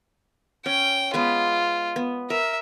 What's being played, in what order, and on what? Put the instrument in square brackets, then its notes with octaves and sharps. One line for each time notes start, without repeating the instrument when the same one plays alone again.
[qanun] C#4 [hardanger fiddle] G5
[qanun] G#3 B3 B4 [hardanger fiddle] F4
[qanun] B3
[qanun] A#4 [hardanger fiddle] E5